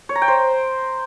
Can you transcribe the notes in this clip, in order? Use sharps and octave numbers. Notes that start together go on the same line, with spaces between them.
C#5
A#5
G5
C5